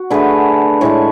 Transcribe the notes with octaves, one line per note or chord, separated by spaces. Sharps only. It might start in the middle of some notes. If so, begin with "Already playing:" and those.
Already playing: F#4
D3 A3 G#4 B4
A2 E3 G#3 A4 C#5